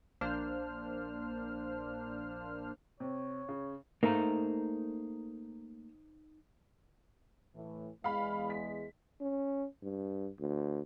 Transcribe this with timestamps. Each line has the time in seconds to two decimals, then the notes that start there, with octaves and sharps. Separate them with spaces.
0.21 A#1 A#3 D4 C5 F6
3.00 C3 C#5
3.49 C#3
4.03 A3 A#3 D#4 C5 A#5
7.55 A2 E3
8.04 E2 G#3 F5 B5
8.50 B6
9.21 C#4
9.83 G2
10.40 D2